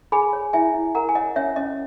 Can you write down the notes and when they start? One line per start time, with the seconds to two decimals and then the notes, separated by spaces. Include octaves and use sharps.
0.12 G#4 G#5 B5
0.33 C#5
0.53 E4 E5 G#5
0.74 E4
0.95 A#4 F#5 A#5
1.09 G#5
1.15 C#5 D#5 F#5
1.36 C#4 C#5 E5
1.56 C#4 D#5